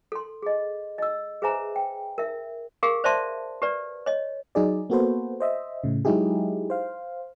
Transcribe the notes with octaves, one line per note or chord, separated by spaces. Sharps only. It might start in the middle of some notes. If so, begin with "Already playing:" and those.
A4 C6
G#4 D#5
D#5 E6
G#4 B4 C5 E5 G#5 A#5
G5
A#4 E5
G4 G#4 A#4 F5
C5 D5 E5 A5 C6
G4 B4 D5
C#5 D#5
F#3 D#4 G#4 D5
A#3 B3 F#4 A4 B4 C5
C5 D#5 E5
A2 C#3
F#3 G#3 D#4 E4 G4 G#4
C5 F5